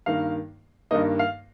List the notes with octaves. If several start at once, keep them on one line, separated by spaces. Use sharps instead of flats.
G2 D#3 A#3 F5
G2 D#3 A#3 D#5
F5